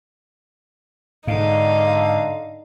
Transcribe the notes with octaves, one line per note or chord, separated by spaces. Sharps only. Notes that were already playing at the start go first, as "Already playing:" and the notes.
G#2 D3 D#4 F5